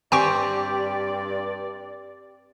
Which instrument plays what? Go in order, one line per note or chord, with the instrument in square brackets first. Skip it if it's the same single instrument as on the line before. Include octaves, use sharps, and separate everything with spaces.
[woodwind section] G2 D5 [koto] C4 G4 [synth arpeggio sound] G5 G#5 C#6